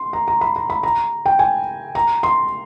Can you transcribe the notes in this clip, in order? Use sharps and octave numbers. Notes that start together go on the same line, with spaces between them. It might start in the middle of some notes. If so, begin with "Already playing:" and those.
Already playing: C6
A#5
A#5
B5
A#5
B5
A#5
G5
G#5
A#5
C6